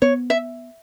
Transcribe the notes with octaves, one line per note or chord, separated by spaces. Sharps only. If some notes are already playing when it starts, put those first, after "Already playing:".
B3 C#5
E5